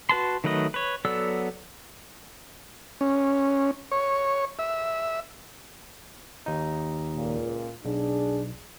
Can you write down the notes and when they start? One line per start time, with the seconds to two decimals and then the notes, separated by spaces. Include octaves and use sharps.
0.09 F#4 B4 A5 C6
0.44 D#3 F#3 A3 B4 D#5
0.74 B4 C#5
1.05 F#3 B3 A4 D5 E6
3.01 C#4
3.92 C#5
4.59 E5
6.46 D#2 D#4
7.14 C#2 A#2
7.85 B1 D4 G#4